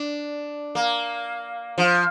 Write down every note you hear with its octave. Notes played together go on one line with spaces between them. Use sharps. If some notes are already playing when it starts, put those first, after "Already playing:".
Already playing: D4
A#3
F3